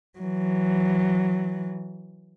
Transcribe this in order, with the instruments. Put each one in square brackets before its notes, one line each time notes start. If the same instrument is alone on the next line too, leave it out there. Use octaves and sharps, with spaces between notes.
[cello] E3 F#3